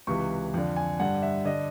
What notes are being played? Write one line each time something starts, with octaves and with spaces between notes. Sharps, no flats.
C#2 C3 E3 C#6
F2 D3
G#5
G2 D3 F#5
E5
D3 D#5